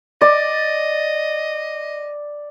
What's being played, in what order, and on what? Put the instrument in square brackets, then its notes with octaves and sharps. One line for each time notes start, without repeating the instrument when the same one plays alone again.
[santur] D5 [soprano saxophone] D#5